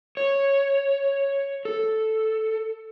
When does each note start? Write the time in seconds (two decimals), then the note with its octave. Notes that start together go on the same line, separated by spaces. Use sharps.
0.17 C#5
1.65 A4